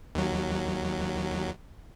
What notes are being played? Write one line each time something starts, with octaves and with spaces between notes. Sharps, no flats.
D#2 F#3